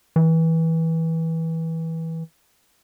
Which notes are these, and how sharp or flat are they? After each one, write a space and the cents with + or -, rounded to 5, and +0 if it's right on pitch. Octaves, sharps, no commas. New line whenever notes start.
E3 -20